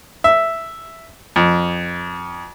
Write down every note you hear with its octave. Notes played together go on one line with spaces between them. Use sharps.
E5
F2